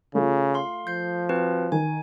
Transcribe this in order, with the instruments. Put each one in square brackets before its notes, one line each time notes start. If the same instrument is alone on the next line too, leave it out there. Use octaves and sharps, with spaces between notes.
[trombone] C#3 [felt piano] A3 F4
[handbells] F5 C6
[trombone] F3 [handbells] G6 C7
[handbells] C4 F#4 B4
[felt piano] D#3 [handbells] G#5